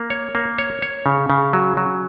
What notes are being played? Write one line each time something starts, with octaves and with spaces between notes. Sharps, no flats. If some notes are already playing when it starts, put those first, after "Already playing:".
Already playing: A#3
C#5
A#3
C#5
C#5
C#3
C#3
F#3
F#3